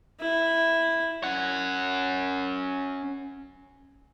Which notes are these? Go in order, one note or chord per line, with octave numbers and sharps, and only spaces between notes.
E4
C#4 F#5